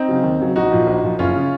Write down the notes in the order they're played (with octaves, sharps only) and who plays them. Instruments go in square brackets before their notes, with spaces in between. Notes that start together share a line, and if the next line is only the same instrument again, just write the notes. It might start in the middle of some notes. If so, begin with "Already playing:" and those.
Already playing: [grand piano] C4 D#4
C#3 F#3
D#2
C#3 F#3
A#1 D#4 F#4
A#2 F3
A#1
A#2 F3
F#1 C#4 F4
C#3